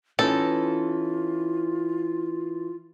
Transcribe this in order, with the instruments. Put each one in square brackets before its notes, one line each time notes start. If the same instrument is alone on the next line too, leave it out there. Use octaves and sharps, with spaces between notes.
[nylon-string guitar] E3 C#4 D#4 [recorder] F4 [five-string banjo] A4